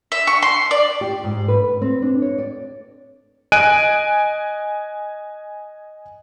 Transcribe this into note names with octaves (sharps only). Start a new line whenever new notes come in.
E5
C#6
C6
D5
G4
G#2
B4
B4
C4
D4
C#5
D5
D#5 G#5 F#6 D7 D#7